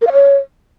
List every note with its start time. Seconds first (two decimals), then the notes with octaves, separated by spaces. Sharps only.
0.02 A#4
0.07 F5
0.13 C#5